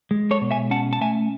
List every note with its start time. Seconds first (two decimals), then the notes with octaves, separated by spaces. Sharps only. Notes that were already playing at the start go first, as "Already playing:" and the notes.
0.11 G#3
0.31 A4 C#5
0.41 B2
0.51 E5 G#5
0.71 C#4 F#5 A5
0.93 A5
1.01 A3 E5 G#5